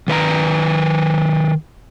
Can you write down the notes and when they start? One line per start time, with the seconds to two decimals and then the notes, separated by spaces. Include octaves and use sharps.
0.08 D#3 B4 E5 A#5